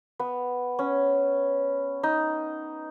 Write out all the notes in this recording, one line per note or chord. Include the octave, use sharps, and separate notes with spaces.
B3
C#4
D#4